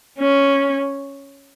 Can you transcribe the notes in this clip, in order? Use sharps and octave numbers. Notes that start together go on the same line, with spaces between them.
C#4